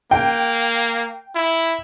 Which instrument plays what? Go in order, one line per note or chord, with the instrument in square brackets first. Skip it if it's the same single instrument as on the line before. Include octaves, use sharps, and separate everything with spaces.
[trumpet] A#3 [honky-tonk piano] G5
[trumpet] E4